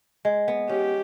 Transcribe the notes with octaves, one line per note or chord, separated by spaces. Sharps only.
G#3
B3
C#4 G4